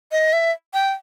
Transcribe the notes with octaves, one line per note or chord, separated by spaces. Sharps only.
D#5
E5
G5